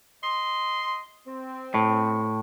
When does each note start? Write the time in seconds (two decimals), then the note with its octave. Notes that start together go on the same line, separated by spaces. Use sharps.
0.24 D#5 C6
1.27 C4
1.74 A2